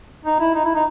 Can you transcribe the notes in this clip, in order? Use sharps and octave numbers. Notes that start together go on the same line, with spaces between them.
D#4
E4
D#4
E4
D#4